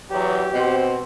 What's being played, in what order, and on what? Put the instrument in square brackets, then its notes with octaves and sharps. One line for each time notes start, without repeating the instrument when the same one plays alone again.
[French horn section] E2 F#3 [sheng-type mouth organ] G4
[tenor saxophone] B2 [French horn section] C4 C5